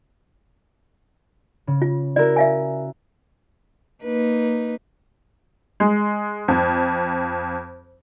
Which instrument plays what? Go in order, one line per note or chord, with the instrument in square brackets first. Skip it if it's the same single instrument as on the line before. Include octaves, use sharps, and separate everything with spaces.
[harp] C#3
[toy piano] F4
[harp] E4 F#4 A#4 [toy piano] D5
[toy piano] E5 F5 G#5
[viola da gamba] A#3 D#4 B4
[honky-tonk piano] G#3
F2